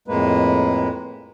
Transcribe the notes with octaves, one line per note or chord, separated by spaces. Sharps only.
F2 A2 G#3 A#3 B4